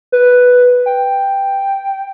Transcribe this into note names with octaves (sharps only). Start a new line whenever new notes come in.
B4
G5